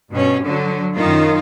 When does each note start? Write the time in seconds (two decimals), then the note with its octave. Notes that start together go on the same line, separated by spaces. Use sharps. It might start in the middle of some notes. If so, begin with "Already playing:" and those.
0.12 G2 B2 C#4
0.44 D3 F#3
0.97 F#2 D#3 D#4 F4